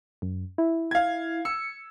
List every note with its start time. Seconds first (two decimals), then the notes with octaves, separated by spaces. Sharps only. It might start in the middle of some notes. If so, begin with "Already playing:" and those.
0.22 F#2
0.58 E4
0.91 F5 G#6
1.45 E6 C#7